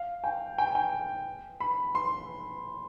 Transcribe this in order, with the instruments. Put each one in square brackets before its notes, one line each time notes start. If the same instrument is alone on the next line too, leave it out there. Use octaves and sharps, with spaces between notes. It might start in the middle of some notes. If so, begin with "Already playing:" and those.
Already playing: [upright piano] F5
G5
G5
G#5
G5
B5
C6